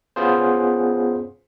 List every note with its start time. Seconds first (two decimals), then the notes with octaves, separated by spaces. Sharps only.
0.16 B3 C#4 F4 G#4 C5